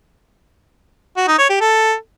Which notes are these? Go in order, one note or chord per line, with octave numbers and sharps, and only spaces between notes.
F#4
D#4
C#5
G4
A4